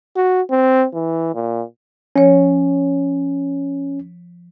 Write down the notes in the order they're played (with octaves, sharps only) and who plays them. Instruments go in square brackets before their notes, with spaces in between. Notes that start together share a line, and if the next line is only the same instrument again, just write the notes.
[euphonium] F#4
C4
E3
A#2
[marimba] F3 C#5 [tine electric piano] C#4